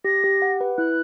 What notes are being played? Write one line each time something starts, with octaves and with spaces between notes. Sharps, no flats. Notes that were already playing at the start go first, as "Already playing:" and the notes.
G4 A#6
G4
F#5
B4
E4 F#6